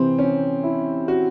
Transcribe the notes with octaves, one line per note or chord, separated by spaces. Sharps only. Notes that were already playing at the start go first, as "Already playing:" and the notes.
Already playing: C3 E3 C4
C#4
E4
F#4